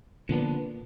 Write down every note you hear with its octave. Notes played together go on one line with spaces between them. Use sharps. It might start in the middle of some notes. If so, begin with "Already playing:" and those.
A#2 D3 F3 B3 D4